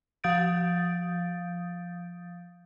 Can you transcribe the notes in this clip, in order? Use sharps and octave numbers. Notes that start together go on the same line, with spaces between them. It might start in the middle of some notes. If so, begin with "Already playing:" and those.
F3 F5 D#6 G6 A6 D7